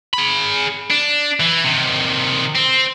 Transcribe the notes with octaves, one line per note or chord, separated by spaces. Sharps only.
G#4 B5
D4
E3
C3 D#3
C4